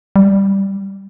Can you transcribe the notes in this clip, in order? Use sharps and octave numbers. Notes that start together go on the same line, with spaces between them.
G3